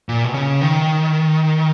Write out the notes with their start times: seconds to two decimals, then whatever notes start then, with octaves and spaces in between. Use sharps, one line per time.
0.09 A#2
0.24 B2
0.34 C#3
0.61 D#3